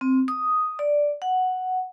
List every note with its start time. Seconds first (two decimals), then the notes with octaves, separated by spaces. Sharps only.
0.01 C4
0.28 D#6
0.79 D5
1.22 F#5